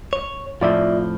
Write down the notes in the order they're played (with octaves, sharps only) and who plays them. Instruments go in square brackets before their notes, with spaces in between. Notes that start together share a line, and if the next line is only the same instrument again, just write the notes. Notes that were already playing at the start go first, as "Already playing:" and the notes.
[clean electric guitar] C#5
[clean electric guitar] F2 A2 F3 [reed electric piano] F4 D5 E5